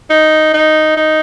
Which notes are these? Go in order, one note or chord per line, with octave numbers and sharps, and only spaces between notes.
D#4
D#4
D#4